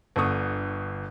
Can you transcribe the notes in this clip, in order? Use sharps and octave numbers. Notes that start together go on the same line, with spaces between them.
G1 D3 C#6 D#6